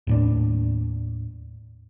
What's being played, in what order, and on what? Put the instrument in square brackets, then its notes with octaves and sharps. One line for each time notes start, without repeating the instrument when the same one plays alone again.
[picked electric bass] D#2 A2 D4